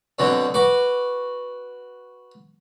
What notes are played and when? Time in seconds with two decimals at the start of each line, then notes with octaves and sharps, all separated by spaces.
0.19 B2 D3 F#3 C4
0.54 F#4 B4 D6